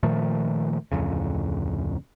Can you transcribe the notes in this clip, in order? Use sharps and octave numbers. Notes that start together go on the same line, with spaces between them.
A#2 D#3 F3 A3
D1 G1 F2 C#3